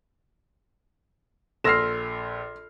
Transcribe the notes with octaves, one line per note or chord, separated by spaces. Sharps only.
A#1 A4 C6 E6 F6 A#6 C7 E7